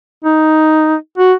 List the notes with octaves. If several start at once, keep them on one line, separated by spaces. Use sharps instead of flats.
D#4
F#4